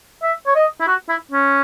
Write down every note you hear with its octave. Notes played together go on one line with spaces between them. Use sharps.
E5
C#5
D#5
E4
F#4
E4
C#4